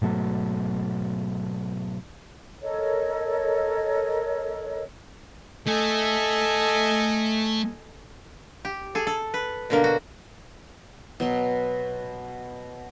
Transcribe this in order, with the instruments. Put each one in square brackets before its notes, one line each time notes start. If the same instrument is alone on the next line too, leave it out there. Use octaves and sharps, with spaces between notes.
[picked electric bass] G#2 B2 F#3 A3
[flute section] A4 A#4 C#5 D#5
[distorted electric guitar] A3 [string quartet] A4 D#5 G#5
[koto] G4
G#4 A4
A4
B4
B2 D3 A#3
F#4
[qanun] B2 F#3 C6